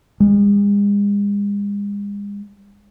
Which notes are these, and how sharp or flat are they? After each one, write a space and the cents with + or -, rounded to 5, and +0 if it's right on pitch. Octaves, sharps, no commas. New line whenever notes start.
G#3 -40